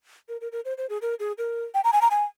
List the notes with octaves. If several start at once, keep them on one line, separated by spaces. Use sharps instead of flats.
A#4
A#4
A#4
C5
C5
G#4
A#4
G#4
A#4
G5
A#5
G#5
A#5
G#5